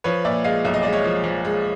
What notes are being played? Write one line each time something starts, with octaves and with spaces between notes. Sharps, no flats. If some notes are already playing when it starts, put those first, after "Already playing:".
F3 B4 C#5
A#2 D5 E5
G#3 D#5 F5
B1 E5
D#5
G#3 D5
C#5 D#5
F3
F3
G#3